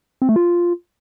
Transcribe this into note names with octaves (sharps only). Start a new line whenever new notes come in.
C4
A3
F4